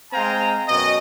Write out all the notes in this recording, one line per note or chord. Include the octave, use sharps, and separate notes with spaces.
G#3 C4 F5 G5 G#5 A#5
F#2 B2 F#4 D#5